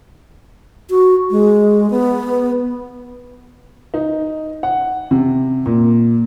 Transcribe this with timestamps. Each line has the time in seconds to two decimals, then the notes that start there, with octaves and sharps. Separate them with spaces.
0.90 F#4
1.31 G#3
1.90 B3
3.94 D#4
4.63 F#5
5.11 C3
5.66 A#2